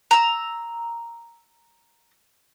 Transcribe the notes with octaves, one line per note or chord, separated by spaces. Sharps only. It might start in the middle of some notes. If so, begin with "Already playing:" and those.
A#5 E6